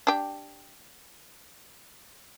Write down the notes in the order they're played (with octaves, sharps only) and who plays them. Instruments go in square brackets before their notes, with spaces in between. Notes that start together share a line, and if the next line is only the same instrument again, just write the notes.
[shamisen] D4 G4